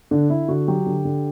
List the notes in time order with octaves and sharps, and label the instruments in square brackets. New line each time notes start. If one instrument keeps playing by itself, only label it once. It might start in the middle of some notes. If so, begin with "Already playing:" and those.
[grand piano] D3 D4
D3 E4
D3 F#4
F#3 G4
D3
D3